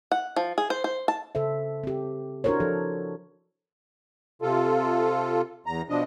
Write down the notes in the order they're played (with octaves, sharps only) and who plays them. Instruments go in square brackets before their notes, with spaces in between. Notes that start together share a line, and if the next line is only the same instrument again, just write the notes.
[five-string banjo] F#5
F3
G#4
C5
C5
A5
[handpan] C#3 A4 C5 E5
C4 G4
D4 E4 F#4 A#4 C5 C#5
F3 A4
[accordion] C3 F4 A4
E2 A#5
B2 F3 D4 D#5